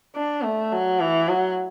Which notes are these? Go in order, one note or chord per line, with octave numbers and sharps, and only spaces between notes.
D4
A3
F#3
E3
F#3